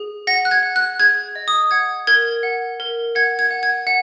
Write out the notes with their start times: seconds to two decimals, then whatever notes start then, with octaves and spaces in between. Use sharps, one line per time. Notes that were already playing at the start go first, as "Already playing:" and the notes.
Already playing: G#4
0.27 F#5 A#6
0.45 F#6
0.51 G#6
0.63 F#5
0.76 F#6
0.99 G#4 G#6
1.35 D#5
1.48 D#6
1.71 F#5 G#6
2.07 A#4 G#6
2.43 F#5
2.80 A#4
3.15 F#5 G#6
3.39 G#6
3.51 F#5
3.63 G#6
3.87 F#5